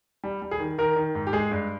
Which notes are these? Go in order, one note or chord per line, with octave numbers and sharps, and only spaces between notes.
G3
G3
G#4
D#3
D#3 A#4
D#3
G#2
G4
G#3 G#4
G2